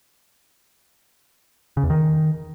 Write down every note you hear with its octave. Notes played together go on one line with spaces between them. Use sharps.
C#3
E2
D#3